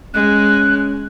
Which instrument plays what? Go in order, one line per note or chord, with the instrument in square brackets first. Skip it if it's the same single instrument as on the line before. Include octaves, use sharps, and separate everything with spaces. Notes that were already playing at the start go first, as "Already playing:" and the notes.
[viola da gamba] G#3 [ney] C#4 [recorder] F#6